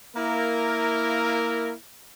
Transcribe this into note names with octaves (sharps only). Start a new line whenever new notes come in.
A#3 E4 A#4